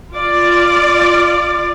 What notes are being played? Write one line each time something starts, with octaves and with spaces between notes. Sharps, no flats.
F4 D5